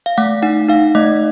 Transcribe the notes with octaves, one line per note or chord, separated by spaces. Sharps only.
F5
A3 F#5
D#4 F#5
D#4 F5
A3 D#5